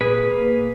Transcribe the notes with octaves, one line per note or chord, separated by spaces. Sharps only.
A#2 G#4 B4
A#3